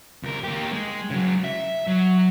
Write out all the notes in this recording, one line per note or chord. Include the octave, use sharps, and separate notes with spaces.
C#2 A#4
A#3 G4
G#3
C#3 F#3
E5
F#3